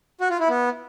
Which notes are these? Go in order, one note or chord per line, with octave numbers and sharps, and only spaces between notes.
F#4
F4
E4
B3